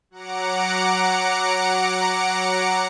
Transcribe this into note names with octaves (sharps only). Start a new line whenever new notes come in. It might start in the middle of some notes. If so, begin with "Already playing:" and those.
F#3 F#5 A#5 D6 C#7